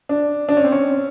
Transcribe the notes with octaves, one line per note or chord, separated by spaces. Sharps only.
D4
D4
C#4
C4
C#4